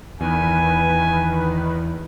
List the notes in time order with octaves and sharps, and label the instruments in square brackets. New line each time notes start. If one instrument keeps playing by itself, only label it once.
[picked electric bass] E2 [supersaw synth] D#3 B4 [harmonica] G#5